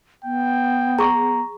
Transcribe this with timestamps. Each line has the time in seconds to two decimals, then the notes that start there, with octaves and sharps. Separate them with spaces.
0.24 B3 G5
0.99 G#4 A#5 C#6 D6